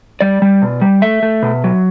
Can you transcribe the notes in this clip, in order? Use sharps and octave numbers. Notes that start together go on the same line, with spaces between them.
G3 D5
G3
B2
G3
A3 E5
A3
B2
F#3